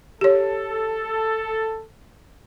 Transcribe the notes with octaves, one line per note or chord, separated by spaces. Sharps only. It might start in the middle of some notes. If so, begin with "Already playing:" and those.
G4 A4 C#5